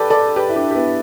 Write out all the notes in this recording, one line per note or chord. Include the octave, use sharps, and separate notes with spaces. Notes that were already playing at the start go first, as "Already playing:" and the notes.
Already playing: G4 A4 B4 D5
A4 D5
G4 B4
E4
D4 G4
G4
B3 E4